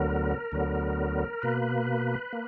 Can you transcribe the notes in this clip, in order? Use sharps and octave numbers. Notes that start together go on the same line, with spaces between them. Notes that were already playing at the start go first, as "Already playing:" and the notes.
Already playing: D2 D3 F#3 B3 A#4
D2 D3 F#3 B3
B2 A#3 B4
A#3